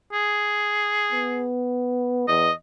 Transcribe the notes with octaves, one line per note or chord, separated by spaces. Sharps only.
G#4
B3
E2 D#5